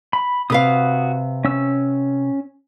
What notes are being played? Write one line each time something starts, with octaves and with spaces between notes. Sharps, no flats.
B5
C3 F#4 B4 F5 D#6
C#4 E6